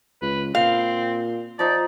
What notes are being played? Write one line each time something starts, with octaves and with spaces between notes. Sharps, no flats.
C#2 B4
A#2 C4 F5
F3 D#4 D5 A#5